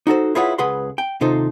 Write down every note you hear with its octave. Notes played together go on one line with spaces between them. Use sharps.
D#4 F#4 A4 C5
E4 F4 G#4 B4 C#5 F#5
C#2 G#4 B4 F#5 C6
G5
D#2 C3 D#4 F4 A4 C5